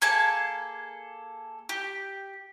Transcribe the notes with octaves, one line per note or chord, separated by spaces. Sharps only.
A#3 G#4 A4 A5
G4